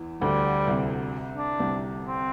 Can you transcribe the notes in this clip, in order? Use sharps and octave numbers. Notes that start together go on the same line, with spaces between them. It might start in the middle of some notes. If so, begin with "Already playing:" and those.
Already playing: E2 E3
D2 D3 G3
C2 C3
D4
C2 C3
C4